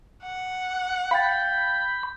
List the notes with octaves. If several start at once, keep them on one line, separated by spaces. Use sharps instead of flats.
F#5
F5 G5 B5 G6 A6